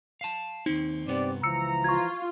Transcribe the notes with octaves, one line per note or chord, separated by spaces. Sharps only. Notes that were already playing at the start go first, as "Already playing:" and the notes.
F5 A5
D#2 C4 D#4
G2 C3 B3 C4 G4 D5
C#2 E3 F3 A#5 E6 C#7
F4 C#6 G#6